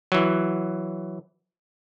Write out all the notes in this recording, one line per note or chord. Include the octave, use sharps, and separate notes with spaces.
E3 F#3